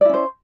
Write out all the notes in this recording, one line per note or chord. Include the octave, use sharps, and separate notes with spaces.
C#4 E4 C5 D5